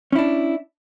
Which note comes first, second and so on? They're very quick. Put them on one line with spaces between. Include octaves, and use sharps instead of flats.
C#4 E4 D4